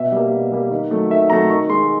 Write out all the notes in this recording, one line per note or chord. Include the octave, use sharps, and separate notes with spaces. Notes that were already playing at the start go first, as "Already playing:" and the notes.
Already playing: B2 E5
G3 A#3
B2
G3 A#3
D#3
F#3 A3
D#3 E5
F#3 A3 A#5
D#3 C#6
G#3 C6